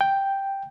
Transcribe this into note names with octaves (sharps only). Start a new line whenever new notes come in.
G5